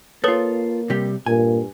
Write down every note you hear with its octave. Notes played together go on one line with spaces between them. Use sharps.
A#3 F4 A4 B4 C#5 D#6
C3 G3 G4
G2 A#2 G#5